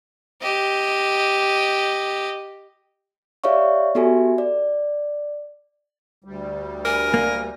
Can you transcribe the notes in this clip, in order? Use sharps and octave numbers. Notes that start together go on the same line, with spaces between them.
G4 D#5
G4 C#5 D5 E5 F5 C#6
B3 F#4 G4 A4 E5 G#5
D5
D2 G3
A#4 G#5
A#3